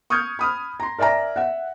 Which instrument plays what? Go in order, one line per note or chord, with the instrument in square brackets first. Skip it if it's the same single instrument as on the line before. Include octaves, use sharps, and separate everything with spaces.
[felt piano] C#6 D#6 F6 G6 G#6
B5 D#6 F6
A#5 C6
A#4 D5 E5 G#5 A#5
E5 F#5